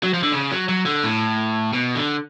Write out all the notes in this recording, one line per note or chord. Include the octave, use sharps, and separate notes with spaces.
F#3
F3
D3
C#3
F#3
F#3
D3
A2
B2
D3